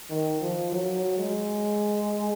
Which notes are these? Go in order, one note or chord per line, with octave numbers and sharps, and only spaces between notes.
D#3
F3
F#3
G#3